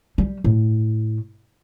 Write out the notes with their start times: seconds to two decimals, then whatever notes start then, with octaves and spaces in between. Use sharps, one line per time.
0.18 G3
0.44 A2